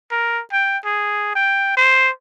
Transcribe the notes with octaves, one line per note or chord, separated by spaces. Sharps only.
A#4
G5
G#4
G5
C5